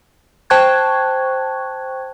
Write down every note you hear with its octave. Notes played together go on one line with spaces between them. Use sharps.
C5 G5 A5 C#6 F#6 G#6